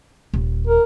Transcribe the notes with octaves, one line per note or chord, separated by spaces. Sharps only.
D#1
A#4